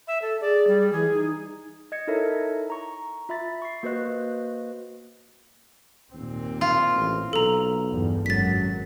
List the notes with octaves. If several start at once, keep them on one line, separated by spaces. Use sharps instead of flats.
E5
A4
G#4 D5
G3
E3 G#4
D#4
D#5 G#6 C#7
D#4 E4 A4 A#4 C#5 E5
A#5 C#6
F4 E5 B5 A6
C#6 C7
A#3 F#4 B4 C5 D#5 F#6
D#2 A#2 C4
F4
A1
B1 A4 A#5
E2 G2
G#1 F#2 F#3 A6 B6